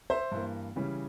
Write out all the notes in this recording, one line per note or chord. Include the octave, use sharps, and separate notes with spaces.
C5 E5
G2 E3 A#3
C#3 E3 G3 C#4